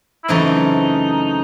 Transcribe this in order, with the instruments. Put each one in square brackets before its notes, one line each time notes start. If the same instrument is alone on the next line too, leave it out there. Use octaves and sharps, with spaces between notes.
[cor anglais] E4
[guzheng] F#2 C#3 E3 A3 C4 [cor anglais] D#4